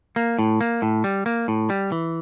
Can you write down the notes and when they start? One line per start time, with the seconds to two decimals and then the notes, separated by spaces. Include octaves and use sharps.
0.16 A#3
0.39 A2
0.61 A#3
0.82 A2
1.04 G3
1.26 A#3
1.48 A2
1.70 G3
1.92 E3